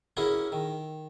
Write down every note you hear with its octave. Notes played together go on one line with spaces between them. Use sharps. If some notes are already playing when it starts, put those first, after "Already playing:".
C#4 E4 F#4 G#4 A#4
D#3